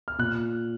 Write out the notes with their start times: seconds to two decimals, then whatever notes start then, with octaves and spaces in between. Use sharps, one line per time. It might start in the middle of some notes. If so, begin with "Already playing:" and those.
0.08 F6
0.18 A#2 F#6